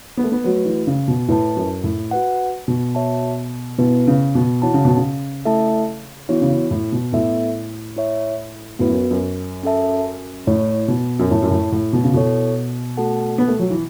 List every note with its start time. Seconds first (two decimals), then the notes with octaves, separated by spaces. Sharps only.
0.17 B3
0.24 A3
0.32 B3
0.44 F#3 A3 F#4 B4
0.65 E3
0.87 C#3
1.08 B2
1.28 A2 E4 B4 A5
1.56 F#2
1.84 A2
2.11 F#4 B4 F#5
2.68 B2
2.95 F#4 C#5 E5 A5
3.78 B2 B3 E4 B4
4.07 C#3
4.35 B2
4.62 E3 F#4 C#5 F#5 A5
4.74 C#3
4.85 B2
4.97 C#3
5.45 A3 E4 A4 E5 A5
6.29 E3 B3 F#4 C#5
6.42 C#3
6.51 E3
6.71 A2
6.92 B2
7.12 A2 B3 A4 E5
7.97 E4 C#5 E5
8.79 A2 B3 F#4 B4
8.90 F#2
9.11 F#2
9.63 C#4 A4 E5 A5
10.47 A2 A3 E4 C#5
10.88 B2
11.19 F#2
11.31 A2 E4 C#5 A5
11.42 F#2
11.51 A2
11.72 A2
11.93 B2
12.04 C#3
12.14 B2 E4 A4 C#5
12.97 A3 F#4 A4 F#5 A5
13.38 B3
13.48 A3
13.59 F#3
13.70 E3